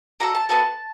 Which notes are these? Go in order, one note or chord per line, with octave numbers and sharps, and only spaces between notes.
D4 F#4 A4 A#5
A5
B3 D4 F#4 A4 A5